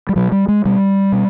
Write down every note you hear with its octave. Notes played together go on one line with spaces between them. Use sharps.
G3
B2 F#3
G3
G#3
B2 G3
B2